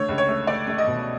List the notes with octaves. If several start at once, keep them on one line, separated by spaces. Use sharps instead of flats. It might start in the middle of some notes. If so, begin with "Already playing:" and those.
Already playing: D3 A3 C#5
C#2
C#5
A3
A3 D5
A3
D#5
B2